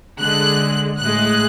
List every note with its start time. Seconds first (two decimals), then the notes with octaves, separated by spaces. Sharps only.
0.21 D3 G#3 F#6
1.01 A2 G#3 F#6